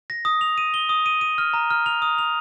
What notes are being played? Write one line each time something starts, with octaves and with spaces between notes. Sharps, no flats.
A#6
D#6
F7
D#7
G7
D#6
D#7
D#7
F6
A#5
F6
F7
D#6
F7